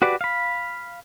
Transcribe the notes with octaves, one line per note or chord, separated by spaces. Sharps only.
F#4 G4 B4 D5
F5 B5